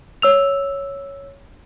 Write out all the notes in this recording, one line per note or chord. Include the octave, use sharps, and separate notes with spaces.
C#5 E6 F7